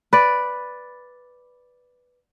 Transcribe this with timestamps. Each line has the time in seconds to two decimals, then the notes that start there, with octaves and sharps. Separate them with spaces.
0.13 B4 D5